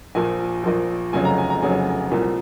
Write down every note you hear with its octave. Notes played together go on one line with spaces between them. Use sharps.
A#1 A#2 F3 G#5
A#1 A#2 F3
F1 F2 C#3 F#3 G#5
A#5
G#5
A#5
F1 F2 C#3 F#3 G#5
C2 A#2 F3